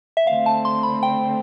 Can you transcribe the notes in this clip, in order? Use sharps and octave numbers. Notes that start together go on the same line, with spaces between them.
E5
D3 A3 C4 F5
A5
C6
B5
G5